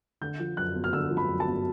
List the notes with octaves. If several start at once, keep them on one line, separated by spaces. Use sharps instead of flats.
D3 G6
F3
F#2 F#6
G1
F6
D3 E6
F3
B5
F#2
A5
G1